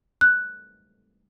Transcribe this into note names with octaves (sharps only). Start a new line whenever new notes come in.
F#6